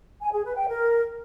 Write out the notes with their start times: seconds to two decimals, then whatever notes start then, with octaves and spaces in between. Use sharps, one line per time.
0.21 G#5
0.33 G#4
0.44 B4
0.56 G5
0.68 A#4